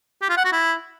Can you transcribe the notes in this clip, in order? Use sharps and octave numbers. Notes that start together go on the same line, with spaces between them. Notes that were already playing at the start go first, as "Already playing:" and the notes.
G4
F4
F#5
F#4
E4